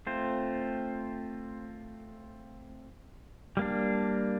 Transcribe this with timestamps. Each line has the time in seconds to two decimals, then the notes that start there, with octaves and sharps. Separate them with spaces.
0.07 A3 C4 F4 C5
3.57 G3 A#3 D4